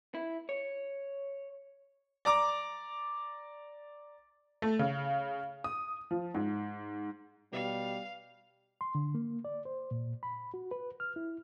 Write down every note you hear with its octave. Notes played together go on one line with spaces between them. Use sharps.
E4
C#5
D5 A#5 D6
A3
C#3
D#6
F3
G#2
B2 G3 F5
C6
D3
A#3
D5
C5
A#2
B5
F#4
B4
F6
E4